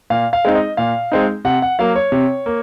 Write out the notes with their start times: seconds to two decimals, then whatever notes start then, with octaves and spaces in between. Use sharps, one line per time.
0.10 A#2 F5
0.33 F5
0.45 G#3 C4 D#4
0.55 D#5
0.77 A#2 F5
1.12 G#3 C4 D#4
1.45 C3 F#5
1.62 F#5
1.79 F#3 A#3 F5
1.96 C#5
2.12 C3
2.46 A#3